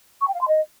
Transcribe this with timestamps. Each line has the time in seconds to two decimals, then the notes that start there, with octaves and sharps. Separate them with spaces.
0.21 C#6
0.28 G5
0.34 F5
0.41 C6
0.48 D#5